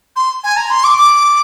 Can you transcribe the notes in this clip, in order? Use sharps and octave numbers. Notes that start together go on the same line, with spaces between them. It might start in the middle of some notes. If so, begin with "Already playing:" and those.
C6
G#5
A#5
C6
D6
D6